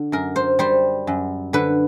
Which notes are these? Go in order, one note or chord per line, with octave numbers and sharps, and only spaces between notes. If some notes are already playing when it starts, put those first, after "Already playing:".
Already playing: D3
F#2 A#4
C5
G3 C5
F#2
D3 B4